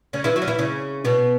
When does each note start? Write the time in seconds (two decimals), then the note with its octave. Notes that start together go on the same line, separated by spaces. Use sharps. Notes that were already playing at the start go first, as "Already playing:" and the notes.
0.13 C#3 C#4
0.24 E3 E4
0.36 F#3 F#4
0.42 C#4
0.48 E3 E4
0.59 C#3 C#4
1.05 B2 B3